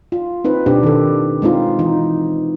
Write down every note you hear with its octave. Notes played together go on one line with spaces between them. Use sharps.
F4
C4 D#4 B4
B2 C4 D4 G4
D#3 A4
G#3 C4 D#4 F4
E3 D#4